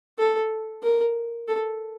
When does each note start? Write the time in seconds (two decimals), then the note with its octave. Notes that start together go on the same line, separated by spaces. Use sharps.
0.19 A4
0.83 A#4
1.48 A4